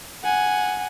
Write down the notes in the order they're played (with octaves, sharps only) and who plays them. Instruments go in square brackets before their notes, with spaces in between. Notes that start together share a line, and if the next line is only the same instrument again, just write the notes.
[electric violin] F#5 G#5